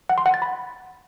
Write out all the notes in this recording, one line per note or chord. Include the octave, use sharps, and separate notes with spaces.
F#5
C6
F#5
A6
B5